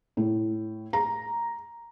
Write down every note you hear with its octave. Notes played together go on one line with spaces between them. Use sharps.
A2
A#5